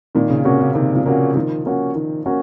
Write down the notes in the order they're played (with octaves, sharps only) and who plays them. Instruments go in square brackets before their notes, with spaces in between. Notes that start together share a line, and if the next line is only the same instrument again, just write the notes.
[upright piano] A#2 [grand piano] D#3
[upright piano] C#3
[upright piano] C3 [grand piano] A#3 C#4 F#4
[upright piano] C#3
[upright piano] C3 [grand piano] D#3
[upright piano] F3
[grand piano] A#3 C#4 F#4
[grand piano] D#3 [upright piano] F3
[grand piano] A#3 C#4 F#4
D#3
A#3 C#4 F#4